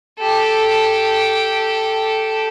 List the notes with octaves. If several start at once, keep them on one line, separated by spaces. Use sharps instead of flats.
G4 A4